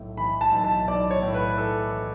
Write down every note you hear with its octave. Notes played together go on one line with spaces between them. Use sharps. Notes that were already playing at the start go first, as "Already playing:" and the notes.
Already playing: B1 A2
E3 B5
A5
B1
A5
B1 D5
C#5
A2
B4
E3 A4